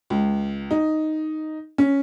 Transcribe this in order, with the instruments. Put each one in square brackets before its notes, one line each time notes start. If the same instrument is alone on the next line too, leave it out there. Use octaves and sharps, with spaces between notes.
[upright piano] C#2
D#4
C#4